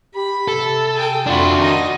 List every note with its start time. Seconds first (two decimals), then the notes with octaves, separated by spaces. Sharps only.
0.15 G4 B5
0.48 C3 A4
0.95 G#4 G5
1.26 F2 D4 F4 F#4 B5
1.58 D#3 D#4 D#5